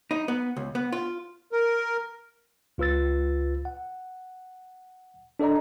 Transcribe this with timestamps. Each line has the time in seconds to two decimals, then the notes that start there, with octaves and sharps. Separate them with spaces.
0.11 D#4
0.28 B3
0.57 C#2
0.75 B3
0.92 F4
1.52 A#4
2.78 C#2 F4 B4 E6 A6
3.65 F#5
5.40 D4 A4 D5 D#5 A#5